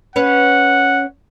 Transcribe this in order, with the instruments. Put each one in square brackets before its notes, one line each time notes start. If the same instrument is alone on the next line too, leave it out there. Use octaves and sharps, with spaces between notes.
[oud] C#4 B4 [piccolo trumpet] F#5